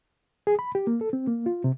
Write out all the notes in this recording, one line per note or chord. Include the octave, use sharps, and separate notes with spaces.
G#4
B5
G4
A#3
A4
C4
A#3
F4
C3